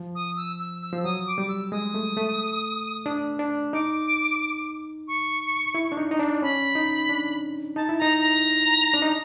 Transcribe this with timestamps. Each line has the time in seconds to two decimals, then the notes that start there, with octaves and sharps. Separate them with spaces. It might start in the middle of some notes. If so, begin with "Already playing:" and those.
Already playing: F3
0.15 D#6
0.37 E6
0.59 E6
0.82 E6
0.93 F3
1.04 F#3 D#6
1.27 D6
1.38 G3
1.48 E6
1.71 G#3 D#6
1.94 A3
2.17 A3
3.06 D4
3.39 D4
3.73 D#4 D6
5.08 C#6
5.75 E4
5.92 D4
5.97 D#4
6.11 D#4
6.19 D4
6.42 C#4 B5
6.75 D#4
7.09 D4
7.76 D#4 A5
7.89 E4
7.98 D#4 A#5
8.21 A#5
8.94 D4
9.02 D#4